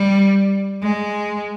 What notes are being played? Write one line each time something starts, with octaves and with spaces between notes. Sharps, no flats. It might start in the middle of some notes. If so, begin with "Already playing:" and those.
Already playing: G3
G#3